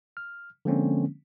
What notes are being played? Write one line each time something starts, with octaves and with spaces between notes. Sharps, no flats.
F6
D3 F3 G#3 A#3 C4 C#4